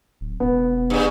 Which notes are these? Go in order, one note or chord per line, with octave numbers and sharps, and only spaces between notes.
D1
E1 B3
G2 C#3